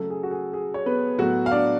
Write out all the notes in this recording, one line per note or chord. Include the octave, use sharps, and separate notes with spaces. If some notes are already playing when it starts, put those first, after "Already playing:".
Already playing: C#3 F#3 A3 A4
G#4
F#4
G#4
G#4
C#5
B3 B4
A2 F#3 B3 F#4 F#5
F5
D4 D5